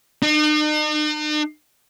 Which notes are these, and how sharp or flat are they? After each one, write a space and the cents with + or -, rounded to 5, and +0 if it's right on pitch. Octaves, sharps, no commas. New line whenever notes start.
D#4 -45